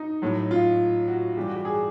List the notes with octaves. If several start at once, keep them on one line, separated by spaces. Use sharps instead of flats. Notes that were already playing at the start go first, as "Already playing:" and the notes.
Already playing: D#4
A2 F#3
F4
F#4
G2 E3 G3 G4
F#4
G4
G#4